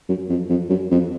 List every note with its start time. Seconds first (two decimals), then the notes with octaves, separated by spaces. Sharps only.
0.09 F#2
0.29 F2
0.49 F2
0.70 F#2
0.91 F2